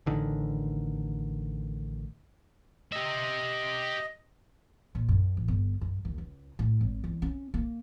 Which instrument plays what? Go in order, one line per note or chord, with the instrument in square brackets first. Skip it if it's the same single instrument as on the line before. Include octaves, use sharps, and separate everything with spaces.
[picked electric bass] A1 D3 D#3
[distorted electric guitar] G4 E5 [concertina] D#5
[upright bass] A#2
F#2
A1
G1
F#2
D#2
C#2
A2
G#1
E2
C#4
A#3